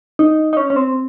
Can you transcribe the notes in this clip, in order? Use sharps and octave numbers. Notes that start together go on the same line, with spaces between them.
D#4
D#4
C#4
C#4
C4